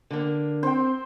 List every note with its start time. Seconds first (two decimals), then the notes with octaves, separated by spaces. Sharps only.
0.11 D3 A#3
0.63 C4 C5 G5